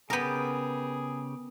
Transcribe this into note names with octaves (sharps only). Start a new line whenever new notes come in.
C#3 B3 G4 G#4 A#4 G6